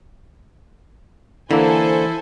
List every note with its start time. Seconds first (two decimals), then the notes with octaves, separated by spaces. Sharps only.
1.51 D3 E3 A#3 E4 A4 C5 G#5